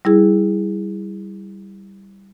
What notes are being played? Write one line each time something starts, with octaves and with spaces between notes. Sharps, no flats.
G3 E4 G#4